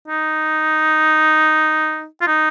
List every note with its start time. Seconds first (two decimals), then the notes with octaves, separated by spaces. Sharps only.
0.08 D#4
2.21 F4
2.27 D#4